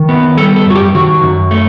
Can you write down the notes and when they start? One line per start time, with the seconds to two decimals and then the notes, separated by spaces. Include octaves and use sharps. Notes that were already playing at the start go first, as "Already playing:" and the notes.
Already playing: D#3
0.09 B3
0.37 G3 A4
0.56 A4
0.66 F#2 F#4
0.75 G4
0.95 D#3 F#4
1.23 F#2
1.51 A3